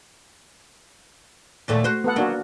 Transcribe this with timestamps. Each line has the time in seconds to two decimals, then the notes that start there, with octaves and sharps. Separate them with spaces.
1.68 D#2 A#2 A3
1.84 F#4 C5
2.04 B3 A4 F#5
2.16 F#3 A#3 D4 F#4